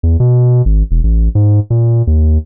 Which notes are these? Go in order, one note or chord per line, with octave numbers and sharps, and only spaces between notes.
E2
B2
G#1
E1
A1
G#2
A#2
D#2